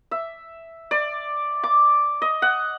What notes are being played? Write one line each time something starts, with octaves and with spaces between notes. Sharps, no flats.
E5
D5
D6
D#5
F#5